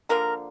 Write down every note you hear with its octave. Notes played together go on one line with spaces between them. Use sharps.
D3 F3 A#3 A#4